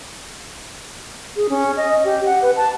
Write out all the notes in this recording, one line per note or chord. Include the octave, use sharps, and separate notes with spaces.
G#4
C#4
D#5
G4
F#5
B4
A5